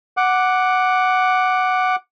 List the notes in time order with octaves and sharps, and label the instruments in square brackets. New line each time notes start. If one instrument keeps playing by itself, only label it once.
[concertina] F#5 D6